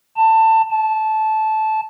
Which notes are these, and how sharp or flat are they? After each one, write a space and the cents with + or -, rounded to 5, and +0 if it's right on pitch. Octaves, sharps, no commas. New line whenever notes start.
A5 +20
A5 -15